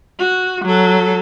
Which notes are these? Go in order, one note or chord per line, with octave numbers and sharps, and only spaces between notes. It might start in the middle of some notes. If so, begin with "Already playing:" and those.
F#4
F#3 A4